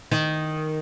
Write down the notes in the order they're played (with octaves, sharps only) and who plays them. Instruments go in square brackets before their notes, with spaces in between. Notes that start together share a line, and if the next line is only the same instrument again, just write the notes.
[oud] D#3